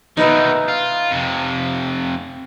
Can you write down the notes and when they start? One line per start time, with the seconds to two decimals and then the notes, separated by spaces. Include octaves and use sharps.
0.17 B2 D#3 D#4 B4 E5
0.68 F4
1.11 F2 C3